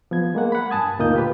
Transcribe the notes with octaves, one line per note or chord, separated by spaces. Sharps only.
F3 B3 G#6
G#3 A#3 F#5
F#5 B5
G2 G#5 A5 D#6 G#6
D2 A#2 A#3 D#4 D#6 G6
F4 G4 B4